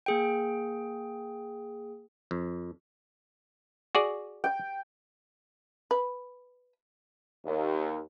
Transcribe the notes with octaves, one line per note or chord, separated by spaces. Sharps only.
A#3 G#4 G5
F2
F#4 G#4 D5
G5
B4
D#2